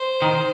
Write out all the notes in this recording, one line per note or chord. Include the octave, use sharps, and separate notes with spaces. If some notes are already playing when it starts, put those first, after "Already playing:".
Already playing: C5
D#3